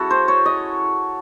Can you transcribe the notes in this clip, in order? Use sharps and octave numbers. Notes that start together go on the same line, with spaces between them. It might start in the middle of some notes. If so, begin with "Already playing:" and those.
Already playing: G#3 C#4 E4 F#4 A4
C5
C#5
D#5